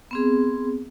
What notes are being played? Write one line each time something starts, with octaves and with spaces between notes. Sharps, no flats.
B3 C4 G#4